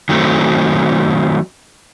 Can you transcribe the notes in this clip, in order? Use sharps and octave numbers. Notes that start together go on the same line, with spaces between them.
D#3 F#3 A3 C4